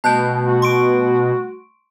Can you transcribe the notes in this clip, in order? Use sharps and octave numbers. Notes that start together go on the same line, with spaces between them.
B2 G3 A3 A5 F#6 G6
F#4
C6 C#6 D7